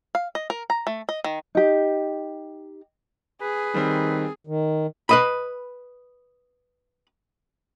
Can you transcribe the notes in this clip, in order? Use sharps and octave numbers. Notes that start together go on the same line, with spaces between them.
F5
D#5
A#4
A#5
A3
D#5
D#3
D#4 G4
G#4 B4
D#3 G3 C4
D#3
B4 D#5 B5